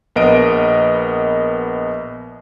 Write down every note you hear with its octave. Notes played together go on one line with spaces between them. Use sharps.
A#1 B3 A#4 D#5 D7